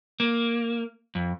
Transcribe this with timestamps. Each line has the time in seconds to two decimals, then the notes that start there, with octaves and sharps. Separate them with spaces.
0.20 A#3
1.15 F2